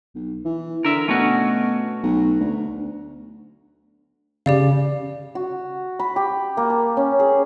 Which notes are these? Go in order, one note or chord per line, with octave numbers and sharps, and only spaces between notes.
B1
E3
D3 A#4 E5
B2 A3 C#4 F#4
B1
D2
C#3 G4 D5 F5
F#4
B5
G4
A#3
A5
C#4
G#4